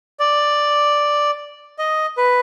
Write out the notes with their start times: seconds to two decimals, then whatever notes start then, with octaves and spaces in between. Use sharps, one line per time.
0.19 D5
1.79 D#5
2.17 B4